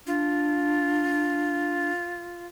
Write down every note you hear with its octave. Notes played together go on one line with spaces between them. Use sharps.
D4 F4